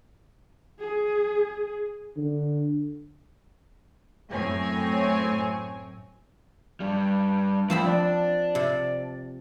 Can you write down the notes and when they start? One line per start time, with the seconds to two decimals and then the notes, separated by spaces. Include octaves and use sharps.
0.79 G#4
2.17 D3
4.32 F#2 A2 C4 C#5 G#5
6.80 G2 G3
7.70 D#3 F3 A3 C4 B5
7.87 D5 A5
8.55 C3